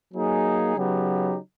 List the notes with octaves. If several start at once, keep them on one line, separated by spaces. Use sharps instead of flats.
F#3 A#3 D#4 G#4
C#3 F#3 B3 D#4 G4